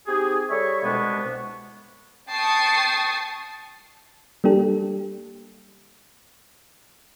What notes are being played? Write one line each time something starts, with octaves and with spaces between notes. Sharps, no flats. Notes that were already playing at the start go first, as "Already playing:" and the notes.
C4 D#4 G4 G#4
G3 A4 C#5 E5 C#6
C2 B2 G#3 B3 D4 C#6
G5 A5 C#6 D#6 C7
G3 A#3 D4 G4 A4